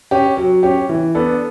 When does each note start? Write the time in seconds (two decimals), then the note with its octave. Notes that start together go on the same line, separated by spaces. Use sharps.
0.11 C#4 G4
0.37 F#3
0.63 C#4 G4
0.89 E3
1.15 B3 D4 A4